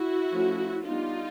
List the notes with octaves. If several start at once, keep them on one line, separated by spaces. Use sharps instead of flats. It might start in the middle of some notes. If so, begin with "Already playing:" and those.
Already playing: E4 F#4
F3 A3 C#4
G3 B3 D4 D#4 F4